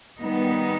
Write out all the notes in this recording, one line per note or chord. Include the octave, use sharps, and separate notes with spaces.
D#3 G3 B3 D#4